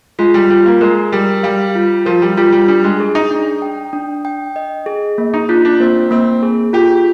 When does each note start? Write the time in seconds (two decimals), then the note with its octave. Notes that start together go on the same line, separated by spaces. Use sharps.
0.19 G#3 F4
0.34 G3
0.50 G3 F4
0.66 A#3
0.81 G#3 A#4
1.12 G3 A#4
1.43 G3 F5
1.75 F4
2.06 F3 A#4
2.22 G3
2.37 G3 F4
2.52 G3
2.68 G3 D4
2.84 G#3
3.00 G#4
3.15 D#4
3.31 D4
3.62 G5
3.93 D4
4.25 G5
4.56 D#5
4.86 G#4
5.18 A#3
5.34 D#4
5.49 D4 F4
5.65 D4
5.80 A#3 C4
6.11 A#3 C4
6.42 G#4
6.73 F4 G4